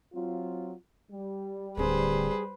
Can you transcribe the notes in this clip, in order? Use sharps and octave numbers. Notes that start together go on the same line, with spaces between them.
F#3 C4 F4
G3
D1 D3 G#4 B4 C5